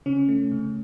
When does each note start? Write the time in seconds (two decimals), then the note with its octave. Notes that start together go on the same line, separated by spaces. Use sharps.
0.06 C#3 C#4
0.28 A3
0.51 C#3